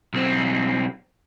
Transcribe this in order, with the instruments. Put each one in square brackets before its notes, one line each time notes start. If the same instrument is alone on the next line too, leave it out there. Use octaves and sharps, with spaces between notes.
[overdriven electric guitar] B1 C4